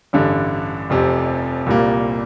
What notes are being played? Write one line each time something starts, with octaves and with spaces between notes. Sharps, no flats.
A1 G2 D3
F1 F2 C3
C2 A#2 G3 A#3